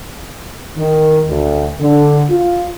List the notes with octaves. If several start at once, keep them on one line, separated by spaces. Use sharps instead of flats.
D#3
D2
D3
F4